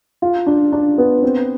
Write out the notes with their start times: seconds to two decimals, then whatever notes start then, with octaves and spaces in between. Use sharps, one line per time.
0.22 F4
0.46 D4
0.72 D4
0.98 B3
1.23 C4